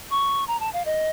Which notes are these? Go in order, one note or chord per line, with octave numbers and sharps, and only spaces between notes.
C#6
A#5
A5
F5
D#5